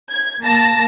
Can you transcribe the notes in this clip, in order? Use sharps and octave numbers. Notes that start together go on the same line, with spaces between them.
G#6
A#3 A5 A#6